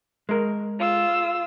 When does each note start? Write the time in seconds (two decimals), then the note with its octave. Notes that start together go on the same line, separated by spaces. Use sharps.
0.29 G#3 A#4
0.79 F4 E6